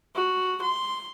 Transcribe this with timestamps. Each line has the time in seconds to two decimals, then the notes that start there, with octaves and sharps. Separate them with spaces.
0.15 F#4
0.62 C6